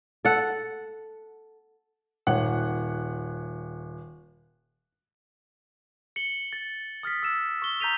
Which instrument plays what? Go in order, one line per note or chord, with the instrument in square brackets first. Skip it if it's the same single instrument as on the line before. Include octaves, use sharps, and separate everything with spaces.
[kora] A4 F#5
[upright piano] D#1 C#5 F#5 F#6
[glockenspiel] C#7 F#7 G7
A6
D#6 F6 A6 B6
E6 E7
C#6 G7
A#5 G6 B6 D#7 F7